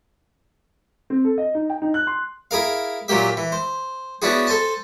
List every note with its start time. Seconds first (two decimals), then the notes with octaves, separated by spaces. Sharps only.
1.10 C4
1.25 A4
1.38 D#5
1.55 D#4
1.70 G5
1.82 D#4
1.94 F#6
2.07 C6
2.51 E4 G#4 A#4 F5
3.08 A#2 F#3 A#3 G4 E5
3.37 E3
3.52 C5
4.22 B3 C#4 D4 E4 F#4 G#4
4.47 A4 C5 G#5 A5